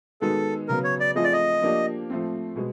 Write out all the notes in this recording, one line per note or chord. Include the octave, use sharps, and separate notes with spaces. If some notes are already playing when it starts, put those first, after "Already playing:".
D#3 G#3 B3 D#4 F#4 A4
C#3 F#3 B3 A#4
C#5
D5
F3 A3 C4 F4 G#4 D#5
D5
D#5
F3 A#3 D4 G4
F3 A3 C4
B2 G#3